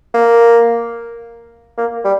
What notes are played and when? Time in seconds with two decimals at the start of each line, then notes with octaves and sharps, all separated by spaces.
0.14 A#3
1.78 A#3
2.04 G3